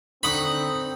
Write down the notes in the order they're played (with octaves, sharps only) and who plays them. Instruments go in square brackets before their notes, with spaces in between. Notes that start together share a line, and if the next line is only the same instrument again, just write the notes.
[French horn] D3 [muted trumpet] C4 [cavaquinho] D#4 C#6 D#6 [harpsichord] F#5 B5